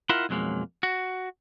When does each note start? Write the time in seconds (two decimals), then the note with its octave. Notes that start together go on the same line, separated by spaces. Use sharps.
0.09 E4 F4 A#4 E5 F#5
0.29 B1 F2 F#3 G#3 A#3
0.83 F#4